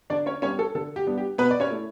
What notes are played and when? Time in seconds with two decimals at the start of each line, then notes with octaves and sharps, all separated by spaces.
0.10 D3 D4 D5
0.26 C#4 C#5
0.42 G3 B3 C#4 D4 C#5
0.59 A4
0.75 D3 A4
0.96 G4
1.06 G3 B3 D4
1.18 G4
1.38 B2 B3 B4
1.51 D5
1.60 C#4 C#5
1.70 A3 E4